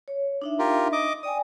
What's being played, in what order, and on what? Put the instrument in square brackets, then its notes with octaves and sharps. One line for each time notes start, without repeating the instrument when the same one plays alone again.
[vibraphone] C#5
D4 D#4 E5
[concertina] F4 G4 A#4
D#5 D6
[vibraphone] D5 G5 G#5 [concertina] D#6